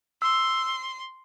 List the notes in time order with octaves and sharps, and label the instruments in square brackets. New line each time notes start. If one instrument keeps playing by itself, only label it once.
[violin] C6 [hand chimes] E6